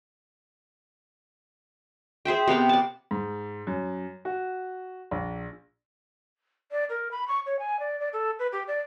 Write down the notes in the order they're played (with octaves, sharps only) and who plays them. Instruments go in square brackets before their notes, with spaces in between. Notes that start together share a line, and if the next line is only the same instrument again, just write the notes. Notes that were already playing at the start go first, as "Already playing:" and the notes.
[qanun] G#4 C5 E5 G5
C3 B3 F5 G5
D5 A5
[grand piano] G#2
F#2
F#4
A#1
[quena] D5
A#4
B5
C#6
C#5
G#5
D5
D5
A4
B4
G4
D5